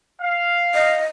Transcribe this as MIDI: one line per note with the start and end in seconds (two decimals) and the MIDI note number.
0.21 0.99 77
0.74 1.05 75